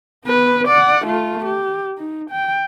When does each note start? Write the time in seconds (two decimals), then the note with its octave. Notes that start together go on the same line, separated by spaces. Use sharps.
0.25 B3 B4
0.68 D5 F#5
1.05 A3 F4
1.45 G4
1.98 D#4
2.31 G5